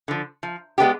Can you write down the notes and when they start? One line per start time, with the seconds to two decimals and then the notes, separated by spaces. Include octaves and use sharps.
0.08 D3 F3
0.43 F3
0.78 G#3 B3 D4 G4